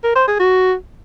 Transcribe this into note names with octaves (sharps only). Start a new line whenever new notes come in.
A#4
C5
G#4
F#4